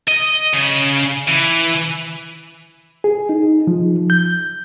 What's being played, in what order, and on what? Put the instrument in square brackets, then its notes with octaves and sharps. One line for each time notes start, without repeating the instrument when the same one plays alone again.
[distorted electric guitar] D#5
C#3
E3
[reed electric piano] G#4
D#4
F3
G6